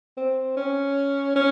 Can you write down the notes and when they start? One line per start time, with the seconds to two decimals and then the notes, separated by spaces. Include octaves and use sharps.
0.17 C4
0.57 C#4
1.36 C#4